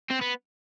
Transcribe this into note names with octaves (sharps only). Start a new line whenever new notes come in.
C4
B3